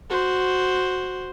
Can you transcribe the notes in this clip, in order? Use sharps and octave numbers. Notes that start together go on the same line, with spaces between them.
F#4 C5